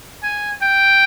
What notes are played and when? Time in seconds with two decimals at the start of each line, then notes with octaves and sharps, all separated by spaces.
0.23 G#5
0.62 G5